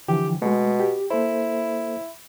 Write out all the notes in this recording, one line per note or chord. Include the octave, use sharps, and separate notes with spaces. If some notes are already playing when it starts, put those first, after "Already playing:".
D3 E3 F3 G4
B2 G#3 A3
G4
A#3 E4 A4 C5